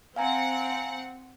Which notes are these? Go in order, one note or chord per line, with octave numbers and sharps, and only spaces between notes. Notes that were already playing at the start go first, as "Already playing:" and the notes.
C4 F5 F#5 G#5 A#5